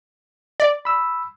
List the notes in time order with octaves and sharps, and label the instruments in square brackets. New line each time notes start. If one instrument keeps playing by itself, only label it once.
[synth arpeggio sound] D5
[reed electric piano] B5 E6